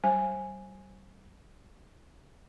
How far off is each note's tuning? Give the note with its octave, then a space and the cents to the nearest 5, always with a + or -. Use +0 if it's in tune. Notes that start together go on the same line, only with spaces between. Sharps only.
G3 -35 C5 +30 G#5 +0